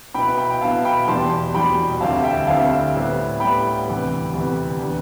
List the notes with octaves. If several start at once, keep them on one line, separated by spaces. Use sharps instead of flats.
B2 B3 E4 G5 B5
G5 B5
G5
B2 B3 E4 F5 A5
G5 B5
E2 B2 G3 A5 C6
E2 B2 G3 G5 B5
D2 D3 G3 C4 E4 F5 A5
E5 G5
D2 D3 G3 C4 E4 F5 A5
A2 G3 B3 E4
A2 G3 B3 E4 G5 B5
D2 C3 E3 G3 B3
D2 C3 E3 G3 B3
E3 B3 D4